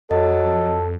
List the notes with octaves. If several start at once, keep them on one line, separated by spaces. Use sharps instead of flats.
F2 F#3 A4 D#5